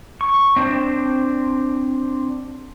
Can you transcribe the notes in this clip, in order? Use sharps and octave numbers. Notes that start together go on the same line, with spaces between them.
C#6
C4 D4 C5